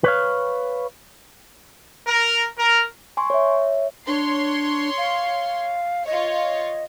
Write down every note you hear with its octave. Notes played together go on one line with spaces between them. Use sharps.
B4 C#5 F5
A#4
A#4
G#5 C6 C#6
C#5 E5
D4 C#5 C6 C7
F5
F4 C#5 D#5